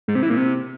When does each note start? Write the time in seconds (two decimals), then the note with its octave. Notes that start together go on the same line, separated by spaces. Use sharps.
0.08 G#2
0.15 C3
0.23 E3
0.30 A#2
0.37 C3